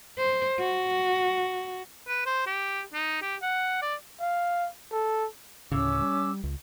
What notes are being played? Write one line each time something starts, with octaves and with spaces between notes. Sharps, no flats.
C5
F#4
B4
C5
G4
D#4
G4
F#5
D5
F5
A4
D2 A2 C#3 C#4 D6 E6
G3
C#2